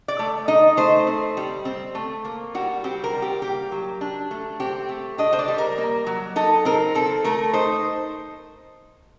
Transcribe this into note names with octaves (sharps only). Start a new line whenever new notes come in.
D5
A3
D#4 D#5
A3 C5
C4
G3
C4
A3
A#3
G3 F#4
C4 G4
A#4
G3
G4
A#3 G4
F#3
D4
A3
C4 G4
A3
D4 D#5
C5
D5
G3
A#4
A#3
F#3
D#4 A4
C4 A#4
C4 A4
A3 A#4
D#4 C5